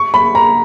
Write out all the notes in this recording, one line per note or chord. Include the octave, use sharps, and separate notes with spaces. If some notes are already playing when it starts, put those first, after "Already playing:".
Already playing: C#6
B5
A#5